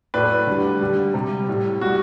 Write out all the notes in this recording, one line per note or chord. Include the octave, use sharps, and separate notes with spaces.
A2 F#3 A3 B4 D5
D3 G3
D3 G3
C3 G3
A2 G3
B2 G3 F#4